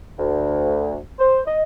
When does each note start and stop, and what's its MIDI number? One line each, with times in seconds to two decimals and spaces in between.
0.18 0.97 38
1.19 1.41 72
1.46 1.63 75